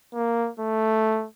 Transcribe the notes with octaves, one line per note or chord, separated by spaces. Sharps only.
A#3
A3